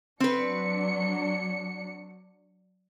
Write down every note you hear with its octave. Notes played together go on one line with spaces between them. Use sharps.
F#3 C4 D4 B4 C#7